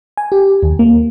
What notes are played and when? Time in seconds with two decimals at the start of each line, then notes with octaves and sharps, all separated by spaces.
0.17 G#5
0.32 G4
0.63 D#2
0.79 A#3